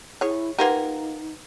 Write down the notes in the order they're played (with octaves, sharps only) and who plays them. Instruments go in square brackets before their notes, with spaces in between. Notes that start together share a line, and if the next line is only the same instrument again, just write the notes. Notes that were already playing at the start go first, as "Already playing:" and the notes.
[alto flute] E4 [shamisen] G#4 C#5
[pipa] A#3 F4 A#4 [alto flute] D#4 [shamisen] G4 [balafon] B4 F#5